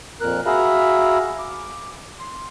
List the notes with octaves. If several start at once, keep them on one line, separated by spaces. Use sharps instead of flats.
F2 A#2 A#4 F#6
F#4 G#4 E5 F5 A#5 B5
D6
C6